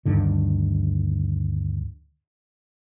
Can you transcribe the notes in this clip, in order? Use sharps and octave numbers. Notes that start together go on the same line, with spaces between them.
D2 G2 D3 D#3